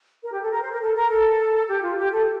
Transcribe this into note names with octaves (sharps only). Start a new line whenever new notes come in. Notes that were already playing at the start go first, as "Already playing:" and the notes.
A#4
G4
A4
A#4
C5
A#4
A4
A#4
A4
G4
F4
G4
A4